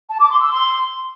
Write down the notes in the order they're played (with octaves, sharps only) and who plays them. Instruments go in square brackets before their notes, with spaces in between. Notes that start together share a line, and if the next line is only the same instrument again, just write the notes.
[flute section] A5
D6
C6
E6
C6